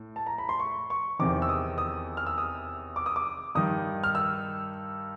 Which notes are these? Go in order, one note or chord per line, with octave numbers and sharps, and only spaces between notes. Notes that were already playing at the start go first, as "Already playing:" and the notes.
Already playing: A2
A5
A#5
B5
C6
C#6
C#6
E2 C3 D#3 D6
E6
D#6
D#6
F6
E6
D#6
D6
D#6
D6
G2 D#3 D#6
F6
E6